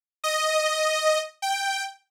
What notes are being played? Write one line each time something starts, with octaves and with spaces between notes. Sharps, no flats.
D#5
G5